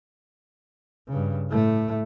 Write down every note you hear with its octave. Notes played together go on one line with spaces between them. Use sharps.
G2 C#3
A2 A3